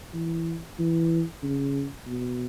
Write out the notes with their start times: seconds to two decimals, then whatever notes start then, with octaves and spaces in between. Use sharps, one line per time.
0.14 E3
0.79 E3
1.43 C#3
2.06 B2